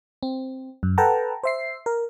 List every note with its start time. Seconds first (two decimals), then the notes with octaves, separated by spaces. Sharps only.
0.23 C4
0.83 F#2
0.98 A4 B4 F#5 G5 A5 A#5
1.44 C5 E5 C7
1.86 A#4